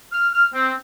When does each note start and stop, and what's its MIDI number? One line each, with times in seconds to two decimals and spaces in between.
0.13 0.29 89
0.34 0.47 89
0.54 0.72 60